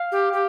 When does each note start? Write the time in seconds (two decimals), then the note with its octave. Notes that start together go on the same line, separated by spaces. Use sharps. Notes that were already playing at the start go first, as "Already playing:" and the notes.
Already playing: F5
0.12 G4
0.33 G4